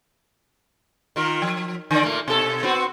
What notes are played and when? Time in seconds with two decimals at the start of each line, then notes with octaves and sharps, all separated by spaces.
1.16 D#3 F4 A#4
1.42 F3
1.91 D3 D5
2.03 A#2 A3 A#3
2.28 B2 A4
2.63 B3 C4 F#4